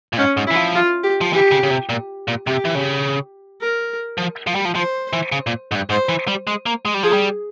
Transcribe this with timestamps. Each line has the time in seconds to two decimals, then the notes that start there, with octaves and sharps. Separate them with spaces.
0.13 A#2
0.17 G#2 C#4
0.37 G#2
0.47 E4
0.51 E3
0.56 F3
0.75 F4
1.03 G4
1.21 F3
1.33 E3 G4
1.51 C#3
1.63 C#3
1.70 C3
1.89 A#2
2.28 A#2
2.46 C3 G4
2.65 E3
2.75 C#3
3.61 A#4
4.18 F3
4.47 F3
4.55 G3
4.65 F3
4.75 F3 C5
5.13 E3
5.32 C#3
5.47 A#2
5.72 G#2
5.75 G2
5.90 G#2 C5
6.09 E3
6.28 G3
6.47 G#3
6.66 A#3
6.85 G#3
6.94 G3
7.03 F3 G#4
7.13 G3